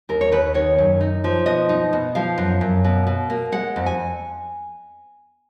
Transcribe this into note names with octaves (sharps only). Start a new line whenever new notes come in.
D#2 A#4
C#5
D#2 B4
D#3 C#5
F#2
D#4
F3
B2 D#5
D#4
B2
F3 F5
F#2
F#2
B2
B2
A#3
G#3 F#5
F2
G#5